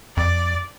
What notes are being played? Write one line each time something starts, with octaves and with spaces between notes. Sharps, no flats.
F2 D5